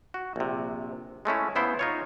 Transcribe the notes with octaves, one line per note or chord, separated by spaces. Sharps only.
F#4
A#1 C3
G#3 A3 C#4 E4
C#3 B3 E4 C5
D#4 F4 C#5